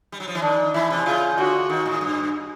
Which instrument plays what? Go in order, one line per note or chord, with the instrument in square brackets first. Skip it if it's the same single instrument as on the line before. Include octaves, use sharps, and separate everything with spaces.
[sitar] G3
F#3
F3
E3
[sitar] D#3 [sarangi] D4
[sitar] E3 [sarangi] E4
[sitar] C3
[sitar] C#3 [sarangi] F4
[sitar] D3 [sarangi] F#4
[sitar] D#3
A2
G2